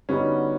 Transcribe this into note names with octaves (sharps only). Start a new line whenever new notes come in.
D3 G3 B3 C#4 D#4 F#4